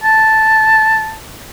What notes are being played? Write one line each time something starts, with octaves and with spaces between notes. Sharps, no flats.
A5